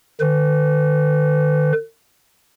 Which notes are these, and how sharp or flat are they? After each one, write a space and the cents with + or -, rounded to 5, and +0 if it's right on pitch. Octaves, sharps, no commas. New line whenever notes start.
D3 +45 B4 +40